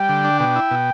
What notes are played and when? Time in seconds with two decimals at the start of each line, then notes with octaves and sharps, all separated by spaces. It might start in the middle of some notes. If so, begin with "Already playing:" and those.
Already playing: G3 G5
0.09 D3
0.24 D4
0.40 B2 G5
0.56 E4
0.71 B2